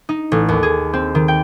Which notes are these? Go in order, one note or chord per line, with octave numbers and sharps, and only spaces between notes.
D#4
A1
D#2
G#4
C4
D#3
G5